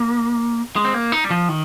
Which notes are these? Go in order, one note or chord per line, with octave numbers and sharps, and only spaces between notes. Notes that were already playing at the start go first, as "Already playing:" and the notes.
Already playing: A#3
G#3
C4
A#3
D#4
G3
F3
D#3